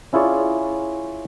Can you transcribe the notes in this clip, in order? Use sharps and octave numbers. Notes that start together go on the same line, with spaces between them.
C#4 E4 F4 G#4 C#5 D5